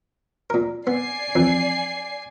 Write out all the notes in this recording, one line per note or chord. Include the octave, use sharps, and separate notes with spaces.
A#2 A#4
B3 D5 G#5 C7
F2 E3